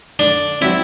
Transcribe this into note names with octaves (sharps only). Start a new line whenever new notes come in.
D3 D4
F#3 C4 E4